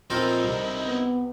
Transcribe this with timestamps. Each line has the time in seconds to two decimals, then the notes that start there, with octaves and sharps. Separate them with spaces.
0.10 A#2 F3 C4 D#4 E4 A4 A#4
0.44 C2 C3
0.87 B3